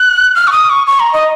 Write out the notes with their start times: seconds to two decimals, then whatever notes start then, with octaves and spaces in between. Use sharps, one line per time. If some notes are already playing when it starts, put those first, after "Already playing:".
Already playing: F#6
0.35 F6
0.47 C#6
0.52 D#6
0.70 C#6
0.87 C#6
1.00 A#5
1.13 D#5